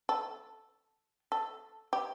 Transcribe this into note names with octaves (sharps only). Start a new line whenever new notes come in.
A4
A4
G4